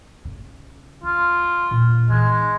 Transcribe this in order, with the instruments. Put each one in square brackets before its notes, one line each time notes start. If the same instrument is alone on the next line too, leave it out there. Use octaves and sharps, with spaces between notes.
[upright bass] C#3
[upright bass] C#2 [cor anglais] F4
[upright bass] E1 A#2
[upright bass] E3 D#4 [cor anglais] G#3